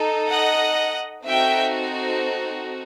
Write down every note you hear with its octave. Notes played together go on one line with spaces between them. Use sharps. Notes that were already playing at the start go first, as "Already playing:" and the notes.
Already playing: D#4 A4
D#5 F#5
C4 D#4 F#4 A4 E5 G5